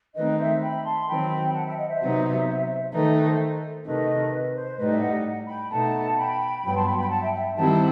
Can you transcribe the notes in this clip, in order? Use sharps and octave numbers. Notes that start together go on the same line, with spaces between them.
D#3 A3 C4 D#4 B4 D#5
C5 E5
G5 B5
A5 C6
D#3 F#3 C4 G5 B5
F#5 A5
E5 G5
D#5 F#5
C5 E5
C3 F#3 B3 D#4
D#3 A3 D#4 B4
A4
C5
B4
C5
C3 D#3 A3 B4 D#5
B4
C5
A2 G3 D#4 B4 D#5
E5
D#5 F#5
G5 B5
B2 A3 D#4 F#5 A5
G5 B5
G2 F#3 B3 G5 B5
A5 C6
G5 B5
G5 B5
F#5 A5
E5 G5
E5 G5
D#3 G3 C4 E4 F#5 A5